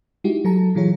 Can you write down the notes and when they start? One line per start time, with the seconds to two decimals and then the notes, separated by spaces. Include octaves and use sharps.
0.24 G#3 D#4 E4 F#4 G4
0.45 F#3 A4 A5 A#5
0.75 A#2 E3 F#3 F4 G#4 C#5